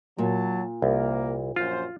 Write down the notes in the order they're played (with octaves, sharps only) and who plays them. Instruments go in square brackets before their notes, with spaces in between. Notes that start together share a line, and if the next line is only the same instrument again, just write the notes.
[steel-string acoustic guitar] A#2 [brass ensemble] F#3 A5
[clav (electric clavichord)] C2 [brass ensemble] A#3
[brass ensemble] A#1 F#2 C5 [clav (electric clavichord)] F4